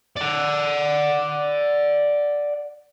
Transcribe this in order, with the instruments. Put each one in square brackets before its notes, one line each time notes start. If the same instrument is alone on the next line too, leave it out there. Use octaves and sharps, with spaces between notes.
[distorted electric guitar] D5 F#5